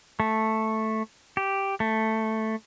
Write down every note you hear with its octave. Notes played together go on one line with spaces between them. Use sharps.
A3
G4
A3